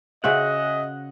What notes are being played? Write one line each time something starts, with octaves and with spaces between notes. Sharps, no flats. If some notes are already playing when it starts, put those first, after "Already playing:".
C#3 F#4 G#4 C5 D#5 E5 F#5 G#5